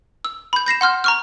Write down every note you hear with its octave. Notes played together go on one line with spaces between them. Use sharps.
E6
B5 G6
G6 A#6 C7 E7
F#5 C6 F6 G6
A#5 C#6 F6